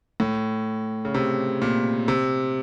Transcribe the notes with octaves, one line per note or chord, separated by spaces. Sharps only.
A2
C#3
C3
A#2
C3